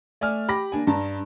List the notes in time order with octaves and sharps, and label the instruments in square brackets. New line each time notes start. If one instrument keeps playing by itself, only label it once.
[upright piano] A3 D5 G#5 F6
G4 B5 D6 A#6
A#3 D4 G#5
G2 A5 A#5